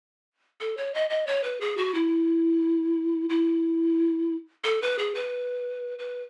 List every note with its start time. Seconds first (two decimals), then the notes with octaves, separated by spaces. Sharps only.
0.61 A4
0.77 C#5
0.94 D#5
1.10 D#5
1.27 C#5
1.44 B4
1.61 G#4
1.77 F#4
1.94 E4
3.29 E4
4.64 A4
4.82 B4
4.99 G#4
5.15 B4
5.99 B4